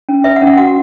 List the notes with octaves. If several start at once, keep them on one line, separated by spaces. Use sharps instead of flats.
C#4
B4 E5
F#5
C#4
F#5
F#4 F#5